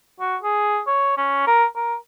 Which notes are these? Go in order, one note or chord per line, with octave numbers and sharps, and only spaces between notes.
F#4
G#4
C#5
C#4
A#4
A#4